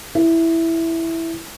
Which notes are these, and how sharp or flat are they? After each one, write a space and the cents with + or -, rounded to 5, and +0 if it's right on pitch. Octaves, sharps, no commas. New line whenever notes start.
E4 +0